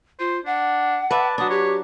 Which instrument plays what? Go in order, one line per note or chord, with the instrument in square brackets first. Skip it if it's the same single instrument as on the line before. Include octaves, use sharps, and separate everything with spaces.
[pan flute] F4 [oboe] C5
[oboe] D4 [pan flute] F#5
[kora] B4 D5 E5 [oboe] A5
[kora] F#3 D4 [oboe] A5 [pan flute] D#6
[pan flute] G4 [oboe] C#5